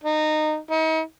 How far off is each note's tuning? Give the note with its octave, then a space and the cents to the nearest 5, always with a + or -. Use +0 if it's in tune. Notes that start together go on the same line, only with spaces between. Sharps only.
D#4 -20
D#4 +40